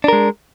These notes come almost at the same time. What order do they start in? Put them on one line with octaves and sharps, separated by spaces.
D4 A#4 G#3